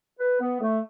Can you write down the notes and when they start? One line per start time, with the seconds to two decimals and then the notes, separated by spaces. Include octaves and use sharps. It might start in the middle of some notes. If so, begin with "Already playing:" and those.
0.19 B4
0.41 B3
0.61 A3